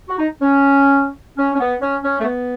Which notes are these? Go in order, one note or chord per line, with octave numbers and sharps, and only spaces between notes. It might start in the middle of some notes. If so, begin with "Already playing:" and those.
F#4
D#4
C#4
C#4
C#4
B3
C#4
C#4
A3
B3